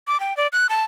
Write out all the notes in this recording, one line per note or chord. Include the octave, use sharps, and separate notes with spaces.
D6
G5
D5
F#6
A5